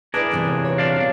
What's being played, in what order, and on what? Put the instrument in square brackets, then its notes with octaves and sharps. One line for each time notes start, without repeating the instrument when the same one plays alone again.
[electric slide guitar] D4 G#4 A#4 [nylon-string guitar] E4 B4 D5
[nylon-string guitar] E2 C3 E3
[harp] A#2 C#5
C#5 A#5 C#6
[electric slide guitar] D4 D5 F5 [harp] F4 F#4
[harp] G2 F4